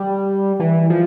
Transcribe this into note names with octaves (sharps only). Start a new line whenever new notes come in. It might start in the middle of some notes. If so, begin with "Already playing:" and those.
Already playing: G3
E3
F3